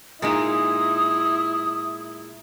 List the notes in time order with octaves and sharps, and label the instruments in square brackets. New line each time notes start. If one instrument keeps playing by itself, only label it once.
[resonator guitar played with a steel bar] A#2 G#3 D#4 [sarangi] E4 [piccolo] D#6